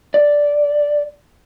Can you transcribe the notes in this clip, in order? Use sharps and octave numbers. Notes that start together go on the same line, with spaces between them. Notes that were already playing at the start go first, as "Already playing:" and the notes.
D5